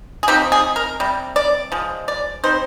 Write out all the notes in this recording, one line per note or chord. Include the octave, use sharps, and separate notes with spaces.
G#4
F3 C4 D#4 G4
G#4
A#4
C3 G3
D5
F3 G#3
D5
G3 C4 D#4 C5